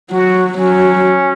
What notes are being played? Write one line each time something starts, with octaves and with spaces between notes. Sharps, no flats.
F#3 F#4
F#3 C#4